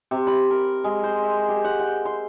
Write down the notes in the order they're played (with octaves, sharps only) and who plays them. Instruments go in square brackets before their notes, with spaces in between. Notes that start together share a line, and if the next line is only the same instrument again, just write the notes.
[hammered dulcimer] C3
B5
A#4
G#3
C5
E5
G4
F#5
G5
C6